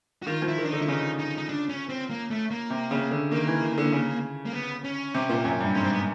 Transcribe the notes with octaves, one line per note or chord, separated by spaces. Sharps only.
F#4
D#3 F4
F3
E4
D#3
D4
D3 D#4
E4
C#3 D#4
D#4
D#4
D4
C#4
C4
A#3
A3
A#3
C3
C#3
D3
D#3 A#3
E3
D#3
D3
C#3
A#3
B3
C#4
C3
A#2
F#2
G2
G#2 C#4
C4
B3